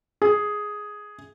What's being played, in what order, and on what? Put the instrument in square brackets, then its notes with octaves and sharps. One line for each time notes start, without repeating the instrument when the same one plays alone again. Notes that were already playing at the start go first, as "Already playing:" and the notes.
[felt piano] G#4